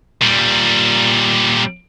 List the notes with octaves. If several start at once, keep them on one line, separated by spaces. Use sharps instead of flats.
A#2 G3